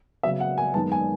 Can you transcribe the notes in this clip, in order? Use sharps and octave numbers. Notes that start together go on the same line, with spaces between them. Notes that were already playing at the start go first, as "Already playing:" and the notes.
C#3 F#3 B3 E5
F#5
G#5
F#2 D#3 G#3 B3 A5
G#5